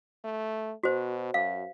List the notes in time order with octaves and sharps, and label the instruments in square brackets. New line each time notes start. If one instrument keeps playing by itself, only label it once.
[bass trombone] A3
[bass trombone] B2 [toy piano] F#4 C5
[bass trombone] F#2 [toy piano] F5